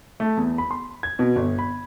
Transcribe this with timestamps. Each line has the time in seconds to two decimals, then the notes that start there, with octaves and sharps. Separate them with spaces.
0.20 A3
0.37 E2
0.58 B5
0.71 C6
1.03 G#6
1.19 B2
1.36 G1
1.59 B5